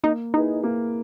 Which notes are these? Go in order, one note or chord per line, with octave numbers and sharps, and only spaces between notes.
A#3 D#4
D#4 E4 G#4 B4
A#3